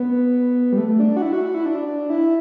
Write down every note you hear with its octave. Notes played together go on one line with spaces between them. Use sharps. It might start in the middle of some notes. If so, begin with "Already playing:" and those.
Already playing: B3
G3
A3
D4
F#4
E4
F#4
F#4
E4
D4
D4
E4